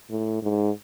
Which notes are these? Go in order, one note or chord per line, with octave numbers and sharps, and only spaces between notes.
A2
G#2